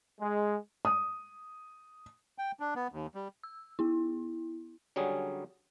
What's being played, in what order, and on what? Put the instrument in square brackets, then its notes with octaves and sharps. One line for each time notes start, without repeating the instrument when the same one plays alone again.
[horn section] G#3
[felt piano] D#6
[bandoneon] G5
D4
B3
D#2
G3
[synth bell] E6
B3 E4
[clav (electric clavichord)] D3 F#3 G3 C#4 G#4